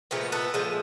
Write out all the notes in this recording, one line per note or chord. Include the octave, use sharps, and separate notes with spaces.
A#2 F3 G#3 A3 B3
A3 B3
A#2 F3 G#3